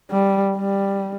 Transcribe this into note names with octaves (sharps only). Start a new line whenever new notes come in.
G3
G3